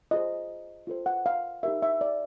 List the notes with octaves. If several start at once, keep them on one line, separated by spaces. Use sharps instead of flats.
F4 G#4 C5 D#5
F4 A4 C5
F#5
F5
D#4 G4 A#4 E5
E5
D5